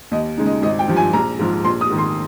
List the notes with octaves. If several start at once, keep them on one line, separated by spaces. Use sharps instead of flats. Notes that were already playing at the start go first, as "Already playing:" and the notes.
D#2 D#5
C#3 G#3 D#4
D#5
G#1 D#5
G5
G2 F3
G#5
A#1 A#5
G#2 F3
A#1 C6
D#6
G#2 D#3
C6